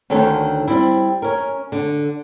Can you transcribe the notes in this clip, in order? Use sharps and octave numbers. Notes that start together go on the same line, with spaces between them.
D2 D3 D#3 C#4 A4
G3 C4 E4
C#4 A#4
D3